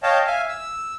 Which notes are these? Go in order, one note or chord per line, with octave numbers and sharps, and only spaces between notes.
C#5 D#5 F5 G5 A5
E5 F5 G#5
E6